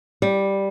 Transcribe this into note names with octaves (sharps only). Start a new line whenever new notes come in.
G3